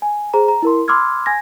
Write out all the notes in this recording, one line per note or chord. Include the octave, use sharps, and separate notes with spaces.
G#5
G#4 C5 A#5
A#5
E4 A#4 C6
B5 C6 D6 E6 F6 G#6
G#5 G#6 A#6